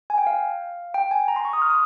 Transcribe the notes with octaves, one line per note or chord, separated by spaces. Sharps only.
G#5
G5
F5
G5
G#5
A#5
C6
C#6
D#6
F6
D#6